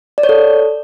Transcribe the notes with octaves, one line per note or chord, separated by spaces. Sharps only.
D5
C#5
A4